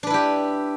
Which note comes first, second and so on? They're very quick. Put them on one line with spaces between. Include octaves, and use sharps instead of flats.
D4 B4 E4 G4